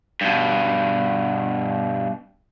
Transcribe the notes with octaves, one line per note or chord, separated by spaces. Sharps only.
G2 B2